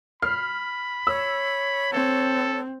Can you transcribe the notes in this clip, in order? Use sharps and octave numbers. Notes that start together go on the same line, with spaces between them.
B5 F6 C7
C#5 E6
C4 A4